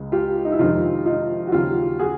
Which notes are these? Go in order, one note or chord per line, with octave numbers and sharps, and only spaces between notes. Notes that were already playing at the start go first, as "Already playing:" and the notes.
Already playing: C#2 C#3 G#3
F4 G4
D#4
E4
F2 C3 D#3 G#3 D#4 F4
D#4 F4
F#4
D#2 C#3 F#3 F4 G4
F#4 G#4